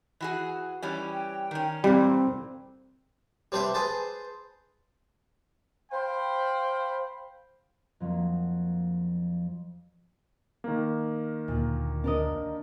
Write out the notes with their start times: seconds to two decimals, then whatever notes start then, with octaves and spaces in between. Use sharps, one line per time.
0.21 E3 F#4 G#4
0.83 E3 G3 C#4
1.13 G5
1.51 D#3 C#4
1.84 A#2 E3 G3 C4
3.52 G3 C4 D4 B4 C5 E5
3.74 G#4 B4 C5 A5
5.92 C5 F5 G5 B5 C6
8.00 F2 F3 F#3 A#3
10.64 D#3 A#3
11.48 D2 A#2
12.04 D4 A#4 D#5